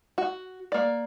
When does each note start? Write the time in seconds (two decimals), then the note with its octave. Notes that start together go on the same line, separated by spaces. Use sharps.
0.18 F#4
0.72 A#3 D5